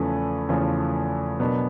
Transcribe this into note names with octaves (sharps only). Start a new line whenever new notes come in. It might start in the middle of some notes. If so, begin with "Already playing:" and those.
Already playing: E2 C#3 F3 A3 C#4 B4
E2 C#3 F3 A3 C#4
B2 F#3 B3 D4 A#4